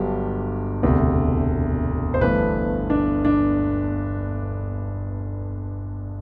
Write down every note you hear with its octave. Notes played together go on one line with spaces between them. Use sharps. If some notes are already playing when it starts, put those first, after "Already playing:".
Already playing: G1 G2 F#3 G4
E1 D2 C3
C5
G1 G2 E3 A3 B4
D4
D4